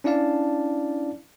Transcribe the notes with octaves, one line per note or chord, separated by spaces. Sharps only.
C#4 D4 E4 D5 F5 A5